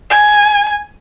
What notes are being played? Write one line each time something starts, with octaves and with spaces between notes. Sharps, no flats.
G#5